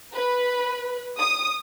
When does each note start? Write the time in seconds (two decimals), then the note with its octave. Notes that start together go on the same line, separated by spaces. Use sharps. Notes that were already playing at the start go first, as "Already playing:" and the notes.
0.14 B4
1.19 D#6